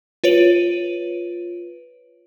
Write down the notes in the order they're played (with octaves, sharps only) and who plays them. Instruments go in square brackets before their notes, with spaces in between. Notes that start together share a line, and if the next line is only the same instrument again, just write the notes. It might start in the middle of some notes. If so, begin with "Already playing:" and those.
[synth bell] F4 B4 C#5 D7 D#7 F#7